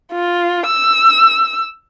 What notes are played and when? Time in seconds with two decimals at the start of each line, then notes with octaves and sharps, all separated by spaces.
0.12 F4
0.66 E6